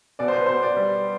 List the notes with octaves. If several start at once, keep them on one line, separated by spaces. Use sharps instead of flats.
B2 D5
C5
B4
B2 C5
D5
G3